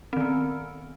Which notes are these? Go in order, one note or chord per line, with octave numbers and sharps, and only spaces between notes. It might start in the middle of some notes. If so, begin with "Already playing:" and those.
D#3 B3 C4